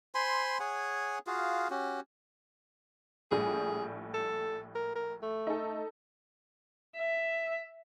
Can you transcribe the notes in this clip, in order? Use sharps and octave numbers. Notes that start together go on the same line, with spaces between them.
C5 G#5 B5 C6
G#4 C#5 F#5 G#5
F4 F#4 G#4 F5
C#4 F#4 G4
A#1 A2 G3 G#4
A4
A#4
A#4
A3
D#4 A4
E5